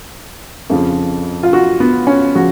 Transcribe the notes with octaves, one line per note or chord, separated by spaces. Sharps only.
F2 C#3 F3
F4
F#4
B3
C#4
C#3 F3 F#4